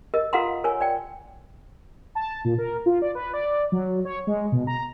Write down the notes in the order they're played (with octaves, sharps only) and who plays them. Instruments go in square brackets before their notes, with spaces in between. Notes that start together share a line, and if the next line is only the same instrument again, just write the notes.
[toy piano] A#4 D#5
F4 A4 F5 F#5 A#5 C6
A#4 C#5 G#5
D5 G5
[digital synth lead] A5
A#2
A#4
F4
D5
B4
D5
F#3
C#5
G#3
B2
A#5